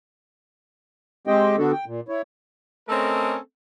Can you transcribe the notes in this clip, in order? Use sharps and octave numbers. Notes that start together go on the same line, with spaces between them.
G#3 C4 G4 C5 D#5 G5
D3 B3 D4 F#4 A4
G5
A#2
E4 C#5
A3 C4 C#4 A4 A#4 D#5